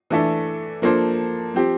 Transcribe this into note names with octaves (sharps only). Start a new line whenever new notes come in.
E3 A3 D4 A4 E5
F3 A#3 D4 A4 C5
F3 C4 G4